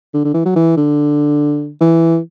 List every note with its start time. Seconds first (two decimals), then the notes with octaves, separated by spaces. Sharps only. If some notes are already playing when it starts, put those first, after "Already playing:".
0.14 D3
0.25 D3
0.34 E3
0.45 F#3
0.56 E3
0.77 D3
1.81 E3